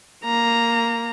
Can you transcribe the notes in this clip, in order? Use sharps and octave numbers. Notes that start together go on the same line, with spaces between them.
A#3 A#5